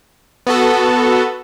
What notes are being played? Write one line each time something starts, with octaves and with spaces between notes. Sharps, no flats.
B3 F#4 A4